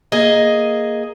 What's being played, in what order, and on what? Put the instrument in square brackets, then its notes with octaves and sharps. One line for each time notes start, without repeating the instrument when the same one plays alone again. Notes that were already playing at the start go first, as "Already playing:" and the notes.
[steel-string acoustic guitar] A#3 G#4 D#5